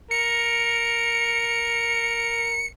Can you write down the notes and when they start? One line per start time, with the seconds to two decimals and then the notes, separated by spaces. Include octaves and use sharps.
0.11 A#4 C#7